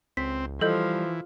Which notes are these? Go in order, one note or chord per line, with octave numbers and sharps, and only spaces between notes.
C#2 C4 B6
E3 F3 G3 A4 D#5 G6